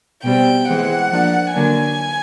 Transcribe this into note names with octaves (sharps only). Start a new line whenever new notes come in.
B2 G3 C4 G5
E3 G#3 C4 F#5
F3 A#3 D4
D3 F#3 A#3 D4 G#5